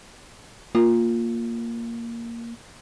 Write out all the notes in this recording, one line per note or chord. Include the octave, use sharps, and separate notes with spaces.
A#3 F4